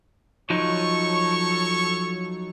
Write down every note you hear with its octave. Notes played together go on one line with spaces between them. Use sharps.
F3 F#3 D#4 A4 C#5 C#6